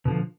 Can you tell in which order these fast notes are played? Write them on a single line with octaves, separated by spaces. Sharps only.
B2 D3 F3